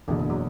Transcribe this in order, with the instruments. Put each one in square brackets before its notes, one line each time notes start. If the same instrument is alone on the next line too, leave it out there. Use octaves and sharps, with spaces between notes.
[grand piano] F#1 E2 B2 [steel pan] D3
[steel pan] D3
F#3